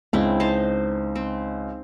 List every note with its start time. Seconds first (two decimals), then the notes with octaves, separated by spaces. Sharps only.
0.13 C#2 C4 D4 E4
0.40 D#4 C5 A5
1.15 C4